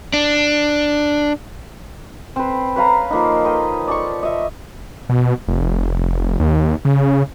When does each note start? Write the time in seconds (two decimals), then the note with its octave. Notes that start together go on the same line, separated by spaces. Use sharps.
0.14 D4
2.36 C4 B4
2.76 B4 C#5 F5 A#5
3.11 F3 A#3 D#4
3.44 B4 C#5 D#5 G5
3.88 D5 A5 C#6
4.23 D#5 E5
5.09 B2
5.48 F1
6.40 D#2
6.85 C#3